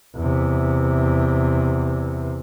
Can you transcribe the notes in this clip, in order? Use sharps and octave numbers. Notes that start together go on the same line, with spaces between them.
E2 C3